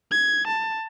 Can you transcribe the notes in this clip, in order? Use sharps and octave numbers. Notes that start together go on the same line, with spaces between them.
G#6
A5